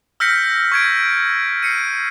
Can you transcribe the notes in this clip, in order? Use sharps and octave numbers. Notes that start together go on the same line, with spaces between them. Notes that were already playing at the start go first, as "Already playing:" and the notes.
E6 F6 G6 A#6 B6 C#7
C#6 G#6 D7
C7 C#7 D#7